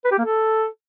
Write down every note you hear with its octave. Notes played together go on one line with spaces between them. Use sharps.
B4
G4
A#3
A4